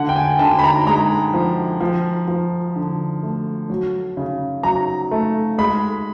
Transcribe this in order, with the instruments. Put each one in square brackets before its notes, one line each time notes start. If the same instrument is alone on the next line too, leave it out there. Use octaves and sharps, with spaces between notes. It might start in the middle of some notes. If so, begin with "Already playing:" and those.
Already playing: [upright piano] D3 F#5
G5
G#5
D3 A5
B5
A#5
G#3 A#5
F3
F3
F3
D3
A3
F#3
C#3
F#3 A#5
A3
G#3 B5